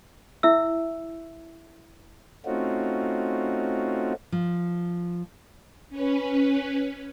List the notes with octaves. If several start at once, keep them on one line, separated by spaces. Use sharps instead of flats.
E4 E5 E6
A3 C4 C#4 D#4 F4 F#4
F3
C#4 B4